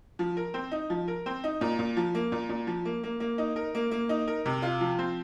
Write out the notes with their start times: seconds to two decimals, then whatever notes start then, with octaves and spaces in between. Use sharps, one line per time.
0.19 F3
0.37 A#4
0.54 C4
0.72 D#4
0.90 F3
1.08 A#4
1.26 C4
1.44 D#4
1.61 A#2
1.79 A#2
1.97 F3
2.15 A#3
2.32 A#2
2.49 A#2
2.67 F3
2.85 A#3
3.03 A#3
3.20 A#3
3.38 D#4
3.56 A#4
3.75 A#3
3.91 A#3
4.09 D#4
4.28 A#4
4.46 C3
4.62 F4
4.81 F3
4.99 C4